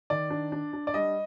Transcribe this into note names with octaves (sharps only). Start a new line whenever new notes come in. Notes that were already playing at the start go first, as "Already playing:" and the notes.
D#3 D5
D4
D4
D4
D5
G3 D#5